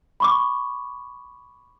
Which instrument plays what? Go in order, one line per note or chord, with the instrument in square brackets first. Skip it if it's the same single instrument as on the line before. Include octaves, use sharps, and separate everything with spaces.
[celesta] B5 C#6 D6